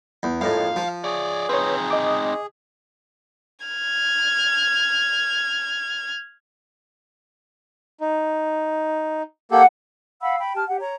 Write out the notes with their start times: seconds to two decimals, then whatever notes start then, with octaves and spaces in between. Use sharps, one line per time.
0.23 E2
0.41 F2 A2 G#3 A#3 D#4 F5
0.76 F3
1.04 G#4 C#5 D5
1.49 C4 D#4 B4 C#5
1.91 D#5 D6
3.66 F6 G#6
8.01 D#4
9.51 A#3 G4 A4 F#5
10.22 F5 F#5 B5 E6
10.38 G5 B5
10.56 G4 A5 F6
10.69 G4 F#5
10.81 C#5 A#5